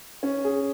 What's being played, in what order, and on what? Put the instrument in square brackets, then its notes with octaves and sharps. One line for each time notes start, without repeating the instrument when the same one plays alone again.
[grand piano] C#4
G#4